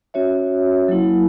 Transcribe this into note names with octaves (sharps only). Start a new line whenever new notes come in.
C#4 F#4 C#5 E5
F#3 A#3 E4